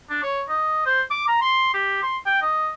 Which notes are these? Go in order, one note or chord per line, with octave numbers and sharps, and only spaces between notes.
D4
C#5
D#5
C5
D6
A#5
C6
G4
C6
G5
D#5